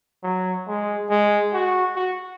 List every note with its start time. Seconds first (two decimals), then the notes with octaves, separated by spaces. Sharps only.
0.23 F#3
0.67 G#3
1.10 G#3
1.53 F#4
1.96 F#4